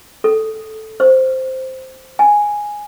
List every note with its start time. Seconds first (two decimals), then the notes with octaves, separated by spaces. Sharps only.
0.24 A4
1.00 C5
2.19 G#5